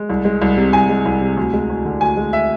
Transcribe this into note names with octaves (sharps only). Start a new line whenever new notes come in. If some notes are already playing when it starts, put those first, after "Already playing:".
Already playing: G#3
C2
G#3
C2
C3
C2 G#5
G#3
C2
C3
D2
G#3
D2
D3
D2 G#5
G#3
E5